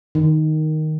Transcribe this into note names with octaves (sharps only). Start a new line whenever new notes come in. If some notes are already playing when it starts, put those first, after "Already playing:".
D#3